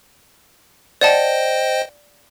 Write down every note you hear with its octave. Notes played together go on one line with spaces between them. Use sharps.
C5 D5 D#5 F#5 G5 A5